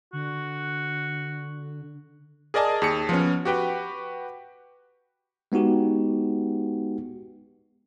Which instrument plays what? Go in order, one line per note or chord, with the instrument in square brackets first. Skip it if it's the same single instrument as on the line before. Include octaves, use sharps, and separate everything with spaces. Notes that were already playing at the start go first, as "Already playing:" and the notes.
[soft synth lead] D3 [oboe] F#4
[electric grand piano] G#4 A#4 D5 D#5 G#5 A5
D#2 G#4 A5 C#7
F3 B3 C#4
F#4 G4 B4 G5
[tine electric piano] G#3 B3 D#4 F#4 G4